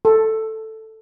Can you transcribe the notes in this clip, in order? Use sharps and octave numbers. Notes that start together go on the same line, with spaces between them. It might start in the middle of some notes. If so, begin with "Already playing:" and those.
A4